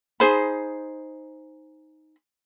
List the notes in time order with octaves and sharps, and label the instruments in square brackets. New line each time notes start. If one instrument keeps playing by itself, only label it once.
[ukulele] D#4 G#4 C5 B5